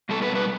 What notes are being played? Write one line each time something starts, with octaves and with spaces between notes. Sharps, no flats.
B2 G3 B3 A4
B4
B4